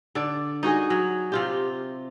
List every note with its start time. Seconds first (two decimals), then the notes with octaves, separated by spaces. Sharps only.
0.15 D3 D5
0.63 D#4 F#4 G#4 D#5
0.90 F#3
1.32 C3 F4 G4